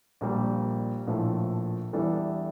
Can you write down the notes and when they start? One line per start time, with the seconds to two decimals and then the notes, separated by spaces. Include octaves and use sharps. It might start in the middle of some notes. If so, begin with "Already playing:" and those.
0.21 A#1 A#2 G3
1.07 A#1 A2 F3 A3
1.93 E2 E3 G3 D4 A4